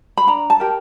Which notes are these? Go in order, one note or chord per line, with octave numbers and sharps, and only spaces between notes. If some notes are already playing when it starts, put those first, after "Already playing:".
B5
D4 A#5
A5
G4 A#4